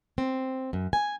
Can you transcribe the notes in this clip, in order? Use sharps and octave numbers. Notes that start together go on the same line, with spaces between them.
C4
F#2
G#5